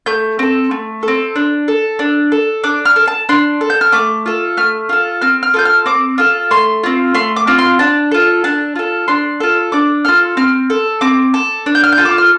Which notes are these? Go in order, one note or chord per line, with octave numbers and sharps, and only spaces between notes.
A3 G6
C4 A4
A3
A4
C4
D4
A4
D4
A4
D4 D6
F6
A4
A5
D4 C6
A4
G6
F6
A3 D6
F4 A4
A3 F6
F4 A4
C4 F6
F6
F4 A4 G6
F6
C4 D6
F4 A4
A3 C6
C4 F4
A3 C6
D6
C4 F4
C6
D4 A5
F4 A4
D4 A5
F4 A4
D4 C6
F4 A4
D4 D6
F4 A4 F6
C4 F6
A4
C4 D6
A4
D4
G6
F6
G6
F4 A4
D6
F6